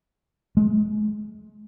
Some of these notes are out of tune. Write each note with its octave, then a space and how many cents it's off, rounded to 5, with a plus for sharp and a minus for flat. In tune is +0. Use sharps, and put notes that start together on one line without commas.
G#3 +35